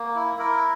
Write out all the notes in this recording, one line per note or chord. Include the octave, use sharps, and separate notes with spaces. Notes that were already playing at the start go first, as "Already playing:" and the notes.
Already playing: A#3
E4
E4 A#4